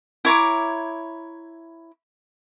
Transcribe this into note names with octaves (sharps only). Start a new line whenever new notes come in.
E4 C#5 A#5 D6